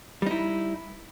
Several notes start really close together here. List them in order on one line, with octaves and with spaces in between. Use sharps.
G3 D#4 E4